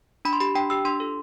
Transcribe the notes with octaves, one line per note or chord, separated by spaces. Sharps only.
D4 B5
C6
G4 B5
D4 G5
G4 E6
D4 C6
F4 A4